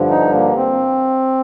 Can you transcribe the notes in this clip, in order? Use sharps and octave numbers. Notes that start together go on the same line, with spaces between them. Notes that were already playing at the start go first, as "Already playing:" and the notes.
Already playing: G2 D3 F3
D#4
A#3
C4